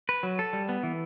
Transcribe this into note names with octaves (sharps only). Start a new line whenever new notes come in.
B4
F#3
A4
G3
B3
E3